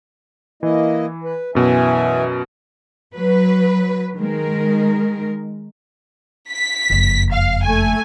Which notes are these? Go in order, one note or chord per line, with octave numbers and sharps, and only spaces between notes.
E3 A#3 E4 D#5
B4
F#2 B2 E3 E5 G#5
F#3 B4
D#3 G#3 A#4
B6
F#1 F2
F5
A3 G#5